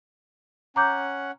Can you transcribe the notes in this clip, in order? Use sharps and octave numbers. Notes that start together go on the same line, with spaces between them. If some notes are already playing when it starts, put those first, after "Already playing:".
C#4 F#5 A#5 D6 G6